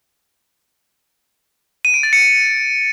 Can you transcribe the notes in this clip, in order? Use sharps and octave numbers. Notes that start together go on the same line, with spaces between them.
D#7
D7
A6
C#7